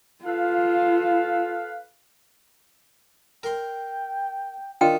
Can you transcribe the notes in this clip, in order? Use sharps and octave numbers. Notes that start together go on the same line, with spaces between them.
F4 A4 B4 F5
A#4 G5 C6
D#3 D4 F4 G5